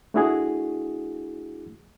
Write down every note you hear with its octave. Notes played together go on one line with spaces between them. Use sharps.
A3 D4 E4 F#4 G#4